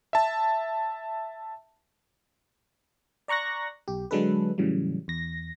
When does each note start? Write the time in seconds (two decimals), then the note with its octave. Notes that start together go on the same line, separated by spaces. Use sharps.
0.13 E5 A5
3.28 D5 A#5 C#6 F#6 A#6
3.88 B1 G4
4.11 D3 F#3 G#3 D4 A4 B4
4.58 A2 C#3 E3 F#3 G3
5.08 E2 A#6